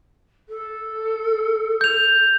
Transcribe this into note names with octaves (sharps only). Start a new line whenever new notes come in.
A4
G6 F7